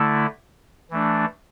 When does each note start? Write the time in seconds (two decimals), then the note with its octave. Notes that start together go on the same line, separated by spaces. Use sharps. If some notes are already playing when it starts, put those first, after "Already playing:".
Already playing: D3 A3 E4
0.90 E3 A3 D4